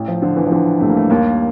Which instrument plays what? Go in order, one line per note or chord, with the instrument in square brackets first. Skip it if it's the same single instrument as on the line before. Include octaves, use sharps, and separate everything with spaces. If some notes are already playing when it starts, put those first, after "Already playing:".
Already playing: [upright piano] A1
[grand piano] F3
[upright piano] D3 [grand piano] F3
[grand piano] E3
F3
[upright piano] D3 [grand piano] E3
[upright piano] G2 [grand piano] A3
[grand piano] A#3
A3
[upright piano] D#2 [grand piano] A#3